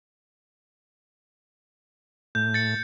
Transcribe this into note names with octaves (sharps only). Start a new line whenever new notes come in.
A2 G6
A6 C#7